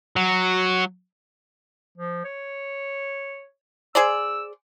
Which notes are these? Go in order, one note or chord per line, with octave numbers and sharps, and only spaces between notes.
F#3
F3
C#5
G#4 C5 D5 E6